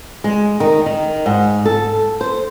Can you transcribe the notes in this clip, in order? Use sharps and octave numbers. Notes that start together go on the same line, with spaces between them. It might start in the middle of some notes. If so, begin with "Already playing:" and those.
G#3
D#3
D#3
G#2
A4
C5